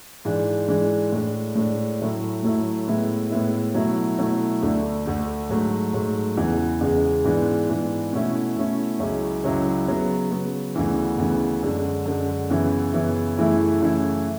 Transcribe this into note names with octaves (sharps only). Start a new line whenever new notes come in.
G#2 E3 G#3 D4
G#2 E3 G#3 D4
A2 G#3 D4
A2 G#3 D4
A2 F#3 A3 E4
A2 F#3 A3 E4
A2 G#3 B3 E4
A2 G#3 B3 E4
B2 F#3 A3 E4
B2 F#3 A3 E4
D2 D3 A3
D2 D3 A3
G#2 F#3 A3
G#2 F#3 A3
E2 C#3 E3 G#3 B3
E2 C#3 E3 G#3 B3
G#2 E3 G#3 B3 D4
G#2 E3 G#3 B3 D4
B2 A3 C#4 E4
B2 A3 C#4 E4
C#2 C#3 F#3 C#4 E4
C#2 C#3 F#3 C#4 E4
C#3 F#3 B3
C#3 F#3 B3
D2 C#3 E3 B3
D2 C#3 E3 B3
F#2 D3 G#3
F#2 D3 G#3
F#2 C#3 E3 B3 E4
F#2 C#3 E3 B3 E4
F#2 C#3 E3 A3 E4
F#2 C#3 E3 A3 E4